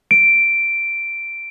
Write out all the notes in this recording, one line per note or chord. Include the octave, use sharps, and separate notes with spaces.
D7